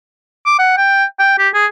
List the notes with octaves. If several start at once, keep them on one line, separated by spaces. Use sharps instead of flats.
D6
F#5
G5
G5
G4
G#4